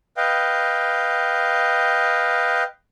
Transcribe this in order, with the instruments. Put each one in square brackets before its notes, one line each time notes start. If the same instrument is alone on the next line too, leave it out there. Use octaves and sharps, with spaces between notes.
[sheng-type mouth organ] B4 D#5 F5 G5